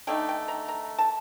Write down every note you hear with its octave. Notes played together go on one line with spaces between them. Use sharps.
D3 A3 D#4 G5
G5
A#5
A#5
A5